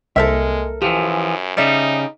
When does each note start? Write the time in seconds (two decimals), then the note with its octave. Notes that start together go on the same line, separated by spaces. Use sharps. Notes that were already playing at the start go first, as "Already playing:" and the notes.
0.16 C2 G#3 A#3 A4 A#4 C5 E5
0.82 F#2 E3 F3 G4
1.57 C#3 G3 D#4 D5 E5